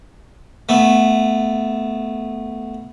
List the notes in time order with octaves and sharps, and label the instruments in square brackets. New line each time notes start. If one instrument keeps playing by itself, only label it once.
[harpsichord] A3 B3